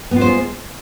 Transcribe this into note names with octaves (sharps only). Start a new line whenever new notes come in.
G#3 B3 F4 C5